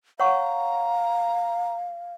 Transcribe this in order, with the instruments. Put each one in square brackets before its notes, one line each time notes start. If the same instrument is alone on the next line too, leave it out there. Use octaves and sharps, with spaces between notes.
[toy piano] C#5 F#5 C#6 [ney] F5 [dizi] A#5